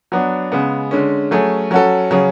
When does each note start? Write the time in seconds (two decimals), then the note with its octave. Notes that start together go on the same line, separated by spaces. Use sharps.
0.12 F#3 B3 D4
0.52 C#3 G#3 B3
0.91 D3 G#3 C#4
1.31 F#3 A3 C#4 G#4
1.71 F#3 C#4 F#4 A4
2.11 C#3 F#3 C#4 G#4